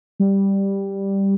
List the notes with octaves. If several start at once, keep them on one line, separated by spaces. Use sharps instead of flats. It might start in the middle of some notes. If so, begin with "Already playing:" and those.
G3